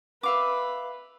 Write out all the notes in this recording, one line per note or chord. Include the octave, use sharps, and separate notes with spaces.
B4 E5 F5 D6